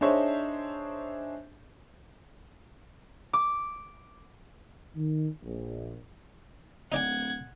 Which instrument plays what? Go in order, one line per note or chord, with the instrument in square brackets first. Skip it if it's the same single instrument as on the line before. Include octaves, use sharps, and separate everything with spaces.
[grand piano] D4 D#4 G#4 C5 C#5 E5
[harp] D6
[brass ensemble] D#3
A#1
[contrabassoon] D1 [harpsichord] D#4 D5 G5 [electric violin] F#5 G#6